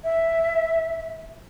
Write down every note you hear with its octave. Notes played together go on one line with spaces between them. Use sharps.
E5